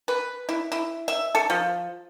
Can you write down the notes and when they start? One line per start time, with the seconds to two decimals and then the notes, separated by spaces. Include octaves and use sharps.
0.08 B4
0.49 E4
0.72 E4
1.08 E5
1.35 A4
1.50 F3